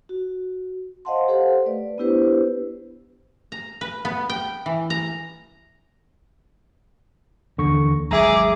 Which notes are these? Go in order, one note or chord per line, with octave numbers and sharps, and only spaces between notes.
F#4
C5 D#5 F5 F#5 A5 C6
G4 A4 C5 F5 F#5
A3 B4 D5
B3 D4 E4 G4 B4 C5
A#5
B4
B3
G5
E3
A#5
D#2 D3 E3 A#3 C#6
G#1 F#3 G#3 G#4 E5 A#5 D6